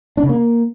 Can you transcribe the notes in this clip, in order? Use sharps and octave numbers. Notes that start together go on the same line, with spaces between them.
D4
C#3
A#3